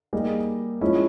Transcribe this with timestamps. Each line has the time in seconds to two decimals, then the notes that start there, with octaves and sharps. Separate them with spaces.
0.13 G3 A#3 D#4 G#4
0.81 F3 G#3 C#4 E4